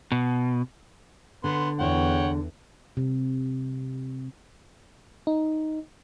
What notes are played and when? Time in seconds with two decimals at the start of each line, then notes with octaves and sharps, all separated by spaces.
0.12 B2
1.44 D3 B3 C6
1.79 E2 C#5 F#5 G5
2.97 C3
5.27 D#4